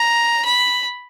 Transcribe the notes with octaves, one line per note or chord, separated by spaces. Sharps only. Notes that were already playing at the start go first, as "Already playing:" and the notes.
Already playing: A#5
B5